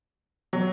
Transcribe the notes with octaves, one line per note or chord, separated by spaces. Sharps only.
F#3